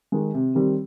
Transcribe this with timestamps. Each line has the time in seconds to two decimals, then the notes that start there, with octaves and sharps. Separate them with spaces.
0.12 D#3 G#3
0.34 C3
0.55 D#3 G3 C4